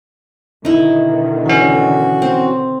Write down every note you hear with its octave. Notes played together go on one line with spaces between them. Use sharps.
B2 D3 D#3 D#4 E4
E3 C#4 F#4
C4